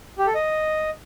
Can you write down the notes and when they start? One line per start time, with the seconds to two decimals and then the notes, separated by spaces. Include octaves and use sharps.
0.18 G4
0.27 A4
0.35 D#5